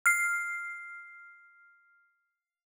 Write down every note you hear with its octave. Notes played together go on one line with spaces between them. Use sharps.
F6 C7